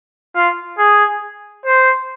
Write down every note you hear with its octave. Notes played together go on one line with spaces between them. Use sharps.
F4
G#4
C5